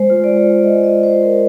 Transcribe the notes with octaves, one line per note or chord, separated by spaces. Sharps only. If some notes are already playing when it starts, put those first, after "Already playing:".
Already playing: G#3 C5
F4
D5
G#3
G#3 D#5
D#5
F4
C5
F4
A#4